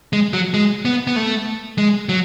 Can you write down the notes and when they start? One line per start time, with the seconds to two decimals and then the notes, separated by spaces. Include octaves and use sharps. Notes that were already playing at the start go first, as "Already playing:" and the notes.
0.13 G#3
0.33 F#3
0.54 G#3
0.85 B3
1.07 B3
1.16 A3
1.78 G#3
2.09 F#3